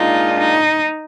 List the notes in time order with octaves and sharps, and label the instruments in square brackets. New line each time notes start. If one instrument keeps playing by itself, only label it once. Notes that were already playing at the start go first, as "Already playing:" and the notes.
Already playing: [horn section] A#2 G#3 D4 F4 [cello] D#4
[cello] D#4